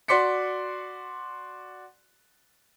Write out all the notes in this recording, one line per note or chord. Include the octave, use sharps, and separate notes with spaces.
F#4 D5 C6 D6 B6 C#7